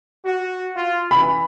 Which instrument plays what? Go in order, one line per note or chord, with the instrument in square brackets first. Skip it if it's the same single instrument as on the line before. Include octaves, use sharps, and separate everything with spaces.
[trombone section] F#4
F4
[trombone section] E3 [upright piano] B5